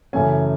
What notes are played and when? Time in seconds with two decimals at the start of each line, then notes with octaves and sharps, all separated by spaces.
0.13 F#2 C#3 E3 A3 C#4 G#5